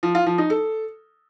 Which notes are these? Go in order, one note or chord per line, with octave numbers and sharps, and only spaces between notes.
F3
F4
F3
D#4
A4